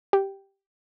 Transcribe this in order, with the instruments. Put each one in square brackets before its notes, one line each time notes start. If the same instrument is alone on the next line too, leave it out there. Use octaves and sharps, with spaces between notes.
[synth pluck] G4